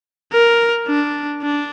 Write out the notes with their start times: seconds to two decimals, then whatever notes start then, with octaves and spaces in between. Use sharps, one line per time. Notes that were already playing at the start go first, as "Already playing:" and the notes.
0.32 A#4
0.87 D4
1.42 D4